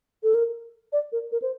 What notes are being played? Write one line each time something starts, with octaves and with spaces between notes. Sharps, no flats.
A4
A#4
D5
A#4
A#4
C5